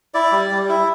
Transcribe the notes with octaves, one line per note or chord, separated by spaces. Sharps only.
E4 D5
G3
G3
E4